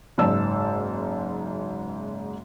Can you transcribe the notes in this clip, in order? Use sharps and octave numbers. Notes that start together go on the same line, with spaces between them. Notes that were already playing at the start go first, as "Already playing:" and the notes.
F#1 G#2 D5 A5 E6